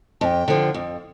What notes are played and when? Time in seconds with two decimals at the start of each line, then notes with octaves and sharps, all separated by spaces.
0.21 F2 G5 A5
0.48 D3 F3
0.74 F2